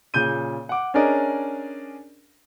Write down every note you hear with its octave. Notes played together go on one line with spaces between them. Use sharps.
A#2 C#3 G6 D#7
F#5 D6
C#4 D4 G#4 A#4 D5 D#5